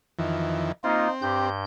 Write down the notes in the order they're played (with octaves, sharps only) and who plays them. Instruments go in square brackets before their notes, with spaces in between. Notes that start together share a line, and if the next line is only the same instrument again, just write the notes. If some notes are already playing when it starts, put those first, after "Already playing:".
[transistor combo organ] F2 D#3 E3
[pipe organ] A#3 F4 [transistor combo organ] C4 [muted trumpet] D#4
[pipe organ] G2 G6 [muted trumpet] G4